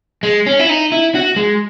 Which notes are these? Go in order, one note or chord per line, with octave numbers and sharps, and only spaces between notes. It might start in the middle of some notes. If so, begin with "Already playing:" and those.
G#3
C#4
E4
D#4
E4
F#4
G#3